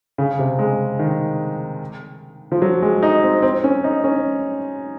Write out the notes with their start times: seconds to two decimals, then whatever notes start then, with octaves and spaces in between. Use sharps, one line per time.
0.18 C#3
0.39 C3
0.59 G#3
0.99 D#3
2.52 F3
2.62 F#3
2.82 G#3
3.03 D#4
3.23 C4
3.42 C4
3.64 C#4
3.84 D#4
4.04 C#4